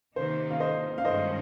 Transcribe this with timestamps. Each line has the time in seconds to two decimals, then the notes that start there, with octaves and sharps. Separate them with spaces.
0.16 C3 D#3 A#3 D#4 C5
0.51 F5
0.60 C5 D#5
0.98 F5
1.05 G2 D#3 G#3 C#4 C5 D#5